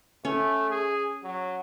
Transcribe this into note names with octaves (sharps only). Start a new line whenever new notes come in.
A3 C#4
G#4
F#3